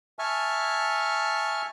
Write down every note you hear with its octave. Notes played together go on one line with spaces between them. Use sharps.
E5 G#5 A5 C#6 F6